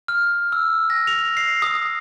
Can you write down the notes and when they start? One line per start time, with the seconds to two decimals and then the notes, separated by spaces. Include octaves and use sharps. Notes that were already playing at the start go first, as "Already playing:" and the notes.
0.08 F6
0.52 E6
0.90 A#6
1.07 F7
1.37 C7
1.62 D#6